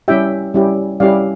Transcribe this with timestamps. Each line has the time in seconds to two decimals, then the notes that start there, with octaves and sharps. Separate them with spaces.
0.08 G3 C#4 E4 G4 E5 G5
0.54 G3 C#4 E4 G4
1.00 G3 C#4 E4 G4 D5 F5